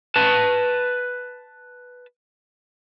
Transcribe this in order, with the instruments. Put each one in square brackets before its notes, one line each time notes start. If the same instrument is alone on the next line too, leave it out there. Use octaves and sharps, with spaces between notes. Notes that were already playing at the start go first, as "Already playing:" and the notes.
[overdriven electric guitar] B4 A5